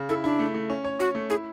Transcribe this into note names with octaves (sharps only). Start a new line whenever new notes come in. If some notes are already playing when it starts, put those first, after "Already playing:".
Already playing: C#3
E4 A4
D4 E4
A3
A3
C#4
C#5
C#4 F#4
A3
E4 G#4